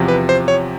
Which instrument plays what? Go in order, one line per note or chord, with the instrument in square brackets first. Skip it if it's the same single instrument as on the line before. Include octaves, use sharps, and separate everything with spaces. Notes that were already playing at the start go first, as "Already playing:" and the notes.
Already playing: [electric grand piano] E2 C3 F3
B4
C5
C#5